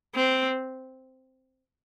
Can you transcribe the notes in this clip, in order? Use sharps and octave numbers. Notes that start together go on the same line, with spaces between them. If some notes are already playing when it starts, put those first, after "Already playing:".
C4